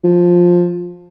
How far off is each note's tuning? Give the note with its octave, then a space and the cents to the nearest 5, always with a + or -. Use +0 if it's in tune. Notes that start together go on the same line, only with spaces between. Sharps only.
F3 +10